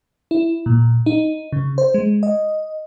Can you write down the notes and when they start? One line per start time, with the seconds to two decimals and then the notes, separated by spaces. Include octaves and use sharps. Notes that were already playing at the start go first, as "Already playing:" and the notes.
0.31 E4
0.66 A#2
1.06 D#4
1.52 C#3
1.78 C5
1.94 G#3
2.23 D#5